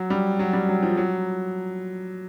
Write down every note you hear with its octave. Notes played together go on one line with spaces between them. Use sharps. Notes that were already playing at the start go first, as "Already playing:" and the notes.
Already playing: F#3
G3
F#3
G3
F#3
F3
F#3